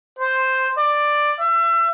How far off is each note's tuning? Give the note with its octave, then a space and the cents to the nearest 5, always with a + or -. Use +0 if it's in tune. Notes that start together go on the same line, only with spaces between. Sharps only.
C5 +0
D5 +10
E5 +35